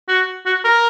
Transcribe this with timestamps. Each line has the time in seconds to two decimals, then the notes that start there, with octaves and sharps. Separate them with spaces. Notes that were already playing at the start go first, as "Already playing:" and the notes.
0.08 F#4
0.46 F#4
0.64 A#4